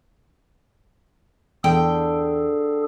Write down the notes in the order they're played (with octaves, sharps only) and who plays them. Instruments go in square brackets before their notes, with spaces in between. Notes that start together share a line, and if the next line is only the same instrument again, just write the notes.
[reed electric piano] E2 [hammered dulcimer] D3 [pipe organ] G#4 A4 [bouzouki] G5